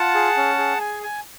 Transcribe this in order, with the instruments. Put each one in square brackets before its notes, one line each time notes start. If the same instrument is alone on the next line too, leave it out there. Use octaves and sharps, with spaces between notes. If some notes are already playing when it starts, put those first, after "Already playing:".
Already playing: [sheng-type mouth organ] F4 [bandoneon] F#5 A5
[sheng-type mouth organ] G#4
C#4
G#4
G#5
G#5